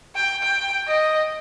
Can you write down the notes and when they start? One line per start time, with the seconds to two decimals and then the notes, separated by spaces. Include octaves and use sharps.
0.16 G5
0.43 G5
0.87 D#5